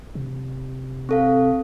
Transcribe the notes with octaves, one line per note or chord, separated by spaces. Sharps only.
C3
C4 A4 F5